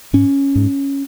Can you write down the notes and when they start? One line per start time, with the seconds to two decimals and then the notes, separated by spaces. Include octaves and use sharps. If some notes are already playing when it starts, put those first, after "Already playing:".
0.13 G#2 C#4
0.55 G#2